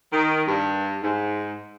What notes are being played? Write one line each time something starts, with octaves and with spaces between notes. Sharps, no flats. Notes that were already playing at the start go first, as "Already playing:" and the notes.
D#3
G2
G#2